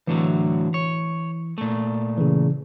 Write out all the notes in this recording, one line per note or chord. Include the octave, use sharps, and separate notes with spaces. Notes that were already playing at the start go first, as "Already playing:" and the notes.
A2 D3 E3 F#3
C#5
A#2 A3
C#3 E3